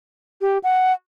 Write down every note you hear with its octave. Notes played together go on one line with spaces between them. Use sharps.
G4
F#5